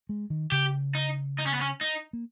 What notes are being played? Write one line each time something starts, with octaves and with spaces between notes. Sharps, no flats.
G#3
D#3
C#3 G4
D#4
D#4
C#4
B3
C#4
D#4
A#3